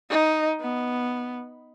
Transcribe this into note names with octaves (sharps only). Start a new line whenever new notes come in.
D#4
B3